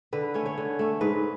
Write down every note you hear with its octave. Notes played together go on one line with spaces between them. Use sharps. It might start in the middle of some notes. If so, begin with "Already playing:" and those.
D3 B4
A3 C#4 C#5
C#5
D3
A3 C#4
G#2 B4